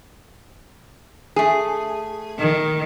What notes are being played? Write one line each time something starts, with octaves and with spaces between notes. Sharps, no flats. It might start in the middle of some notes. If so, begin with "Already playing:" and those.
A3 G#4
D#3